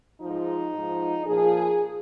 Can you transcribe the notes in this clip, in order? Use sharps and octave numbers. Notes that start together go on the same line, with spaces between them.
G#2 F3 D#4
G#2 F3
A#2 F3 G#4